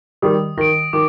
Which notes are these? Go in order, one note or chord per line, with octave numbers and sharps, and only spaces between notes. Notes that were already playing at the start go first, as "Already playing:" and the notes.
D#3 G3 D#6
D#3 A#6 D7
D#3 D6